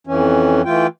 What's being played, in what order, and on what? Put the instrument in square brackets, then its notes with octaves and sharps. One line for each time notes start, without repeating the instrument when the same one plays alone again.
[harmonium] F2 E3 C#4
E3 A3 F4 G5